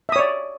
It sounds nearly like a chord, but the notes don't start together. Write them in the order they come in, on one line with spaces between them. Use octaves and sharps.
E5 D#6 C#5 D5